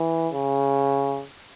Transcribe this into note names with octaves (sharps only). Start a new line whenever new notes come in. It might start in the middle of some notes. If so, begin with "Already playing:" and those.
Already playing: E3
C#3